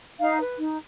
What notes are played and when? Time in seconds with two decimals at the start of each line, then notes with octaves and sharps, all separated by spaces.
0.20 D#4 F5
0.39 B4
0.58 D#4